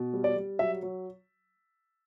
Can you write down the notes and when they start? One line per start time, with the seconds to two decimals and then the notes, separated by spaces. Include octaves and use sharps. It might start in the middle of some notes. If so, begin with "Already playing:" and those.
Already playing: B2
0.13 G3
0.24 D5
0.36 G3
0.59 F#3 E5
0.83 F#3